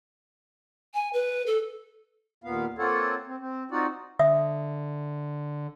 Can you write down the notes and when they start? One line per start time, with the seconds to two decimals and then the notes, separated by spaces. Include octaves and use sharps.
0.94 G#5
1.13 B4
1.46 A4
2.44 D#2 A#2 B3 F5
2.78 A#3 C4 F4 A4 C#5 F#5
3.27 C4
3.41 C4
3.71 C4 D#4 F4 F#4 D5 F#5
4.19 D3 E5 D#6